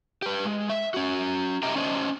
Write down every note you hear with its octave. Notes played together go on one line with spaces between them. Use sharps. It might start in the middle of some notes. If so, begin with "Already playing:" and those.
G4 B4
G#3
E5
C#4 F#4
G4 D#5 E5 G5 A#5
C#4 C5 D5 D#5 F5 A5